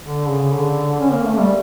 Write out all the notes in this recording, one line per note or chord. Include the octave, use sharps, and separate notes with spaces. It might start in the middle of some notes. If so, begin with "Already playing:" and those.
D3
C#3
D3
C#4
A#3
A3
G3